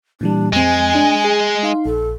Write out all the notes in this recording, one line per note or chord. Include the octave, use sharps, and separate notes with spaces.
A#2 E3 G3 D4
F2 G#3 C4 G#5
D4
G#4
D#4 F5 C6
A#1 A4